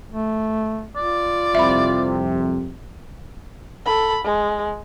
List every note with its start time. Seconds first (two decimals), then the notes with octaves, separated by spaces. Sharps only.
0.11 A3
0.96 F4 D5
1.55 C2 F2 C3 E5 B5
3.86 A4 B5
4.25 G#3